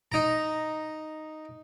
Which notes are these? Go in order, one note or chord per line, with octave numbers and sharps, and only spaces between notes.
D#4 A#5